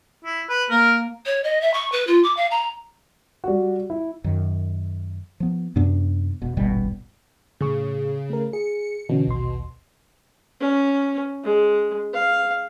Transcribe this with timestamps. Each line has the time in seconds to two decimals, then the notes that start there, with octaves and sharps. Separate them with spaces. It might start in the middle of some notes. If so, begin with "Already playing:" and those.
0.24 E4
0.49 B4
0.71 A#3 A#4
1.26 C#5
1.44 D#5
1.61 E5
1.74 C#6
1.92 B4
2.07 F4
2.23 D6
2.37 F5
2.51 A#5
3.44 G3 F#4
3.90 E4
4.24 F#2 D#3
5.40 F3 B3
5.76 F#2 C3 B3 D4
6.42 E1 B2
6.57 D#1 G#1 B2 G3
7.61 A2 C#3 G#4 C#6
8.30 A3 A#4
8.53 G#4 C#7
9.09 B2 D3 E3 C#4
9.27 A#1 D#2 C6
10.60 C#4
11.44 G#3
12.14 F5